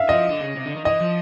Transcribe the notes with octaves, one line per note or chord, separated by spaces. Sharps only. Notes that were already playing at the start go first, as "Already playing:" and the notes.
Already playing: E5 F5
F3 D#5
D3
C#3
C3
D3
D#3
E3 D#5
F3